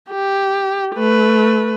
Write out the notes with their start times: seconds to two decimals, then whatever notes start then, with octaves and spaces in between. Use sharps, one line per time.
0.10 G4
0.95 A3 B4